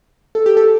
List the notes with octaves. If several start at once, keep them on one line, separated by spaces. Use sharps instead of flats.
A4
G4
A4